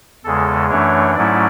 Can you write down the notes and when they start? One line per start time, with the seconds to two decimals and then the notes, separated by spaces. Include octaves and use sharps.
0.24 E2 C#3 G#3 A4
0.70 F#2 E3 A3 D4 C#5
1.15 G#2 F#3 A3 C#4 E4 D5